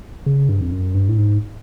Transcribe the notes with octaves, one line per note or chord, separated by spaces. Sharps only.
C#3
G2
F2
F#2
G2
A2
G#2